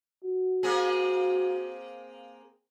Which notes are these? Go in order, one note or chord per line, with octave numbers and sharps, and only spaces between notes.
F#4
A#3 C4 G#4